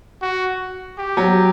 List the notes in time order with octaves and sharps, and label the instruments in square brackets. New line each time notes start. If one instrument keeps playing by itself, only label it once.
[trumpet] F#4
G4
[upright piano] F#3